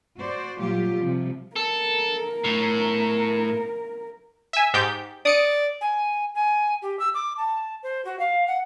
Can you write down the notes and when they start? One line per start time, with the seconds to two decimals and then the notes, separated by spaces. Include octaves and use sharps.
0.19 F#4 C5 D5
0.60 A#2 F#3 G3 F4 G4
0.98 C3 F3 G3
1.56 A4 A#4
2.44 A2
4.53 E5 G#5
4.74 G#2 G4 G6
5.25 D5 D#6 C#7 D7
5.81 G#5
6.34 G#5
6.82 G4
6.99 E6
7.14 D6
7.37 A5
7.83 C5
8.05 F#4
8.19 F5
8.47 F#5